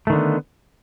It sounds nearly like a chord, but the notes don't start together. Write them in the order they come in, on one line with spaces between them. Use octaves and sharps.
A3 D#3 D3 B3